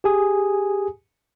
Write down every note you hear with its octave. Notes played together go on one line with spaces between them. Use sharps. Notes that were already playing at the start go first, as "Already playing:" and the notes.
G4 G#4 G#5 D#6